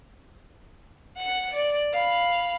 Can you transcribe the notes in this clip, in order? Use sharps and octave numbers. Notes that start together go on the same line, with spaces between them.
F#5 C#7
D5
F5 B5